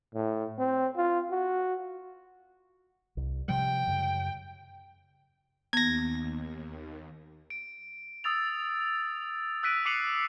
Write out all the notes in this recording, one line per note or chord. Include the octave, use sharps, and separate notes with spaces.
A2
C4
F4
F#4
C2
C3 F3 G3 G5
F#2 C#3
D#2 B3 G#6 A#6
D7
D#6 E6 A6 F7
E6 F#6 B6 D7 D#7
D6 C7 C#7 D#7 F7 F#7